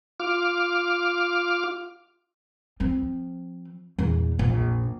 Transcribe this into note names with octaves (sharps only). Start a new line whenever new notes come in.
F4 D6 F6
F3 C4
E2 A#2
A#1 F2